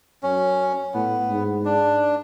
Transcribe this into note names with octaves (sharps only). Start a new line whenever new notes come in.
F#2 C#4
A2 B3
G#2
D4